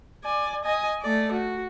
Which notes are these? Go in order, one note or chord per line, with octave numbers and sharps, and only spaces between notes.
D5 G#5
D#5 G#5
A3 D5
F#4